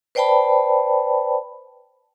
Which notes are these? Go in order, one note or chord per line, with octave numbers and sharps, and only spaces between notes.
B4 C5 D5 G5 A5 B5